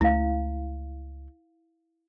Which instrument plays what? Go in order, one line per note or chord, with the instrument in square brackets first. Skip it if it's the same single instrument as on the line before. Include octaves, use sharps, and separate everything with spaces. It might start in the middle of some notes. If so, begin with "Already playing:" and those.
[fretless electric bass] C#2 A3 [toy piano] E4 F5